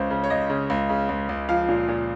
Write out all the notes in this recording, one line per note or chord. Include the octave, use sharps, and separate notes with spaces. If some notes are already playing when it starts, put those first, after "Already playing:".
Already playing: C#2 C#4 C5
C#3
C#5
C#2 D#5
C#3
C#2
C#3
C#2
C#2
F3 F5
A#2
A#2